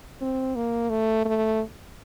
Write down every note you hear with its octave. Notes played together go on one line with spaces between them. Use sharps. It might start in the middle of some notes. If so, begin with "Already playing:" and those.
C4
A#3
A3
A3